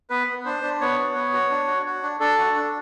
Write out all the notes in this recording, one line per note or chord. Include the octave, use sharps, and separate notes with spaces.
B3 B4
B3
D4 C5
D4
B3 C#5
F#4
B3
F#4
D4
F#4
F#4
D4
D4 A4
F#4
D4